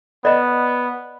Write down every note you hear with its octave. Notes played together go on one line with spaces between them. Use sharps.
B3 D5 D#5 B5